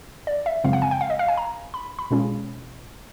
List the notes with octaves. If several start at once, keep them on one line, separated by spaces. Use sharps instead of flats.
D5
E5
F#2 C#3 F3 G#3 C4 F5
F#5
G#5
G5
F5
D#5
F5
G#5
A#5
B5
B5
B2 G#3 C#4 F4 G#4